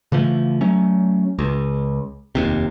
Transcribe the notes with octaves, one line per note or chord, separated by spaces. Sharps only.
C#3 E3 F3 A3
F#3 A3 C#4
C#2
F1 D#2 C3